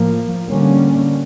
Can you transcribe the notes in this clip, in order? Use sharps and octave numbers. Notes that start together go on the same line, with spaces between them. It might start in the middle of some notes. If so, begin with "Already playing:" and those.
Already playing: A2 F3 A#3
D3 G3 A#3 C#4